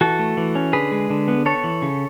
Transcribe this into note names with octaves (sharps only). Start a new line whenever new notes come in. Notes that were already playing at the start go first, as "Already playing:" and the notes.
E3 F#4 A4
A3
E3
C#4
D3 G#4 B4
G#3
D3
B3
B3 A4 C#5
E3
C#3